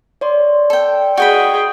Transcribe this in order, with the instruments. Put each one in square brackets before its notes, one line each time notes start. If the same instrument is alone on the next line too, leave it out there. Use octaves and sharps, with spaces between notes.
[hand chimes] C#5 D5 C6
[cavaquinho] A4 G5
[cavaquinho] F#4 D#5 B5 [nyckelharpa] G#4 G5